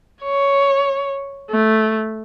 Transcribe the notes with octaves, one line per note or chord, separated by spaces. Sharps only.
C#5
A3